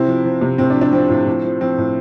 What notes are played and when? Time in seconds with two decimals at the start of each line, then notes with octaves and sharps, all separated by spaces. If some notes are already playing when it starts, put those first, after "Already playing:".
Already playing: C3 C4 E4
0.08 F3
0.25 F3
0.41 C3
0.58 A2 C4
0.70 D4
0.76 F3
0.81 D4
0.93 F3 C4
1.10 A2
1.27 A2
1.44 F3
1.61 F3 C4
1.78 A2